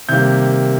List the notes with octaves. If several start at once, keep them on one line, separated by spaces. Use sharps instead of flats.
C3 D#3 G3 A#3 G6